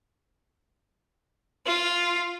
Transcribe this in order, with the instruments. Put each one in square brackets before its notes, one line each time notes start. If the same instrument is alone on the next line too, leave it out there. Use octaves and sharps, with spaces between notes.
[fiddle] F4